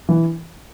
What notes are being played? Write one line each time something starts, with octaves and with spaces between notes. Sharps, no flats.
E3